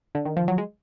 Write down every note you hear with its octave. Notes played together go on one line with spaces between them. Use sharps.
D3
D#3
F3
F#3
G#3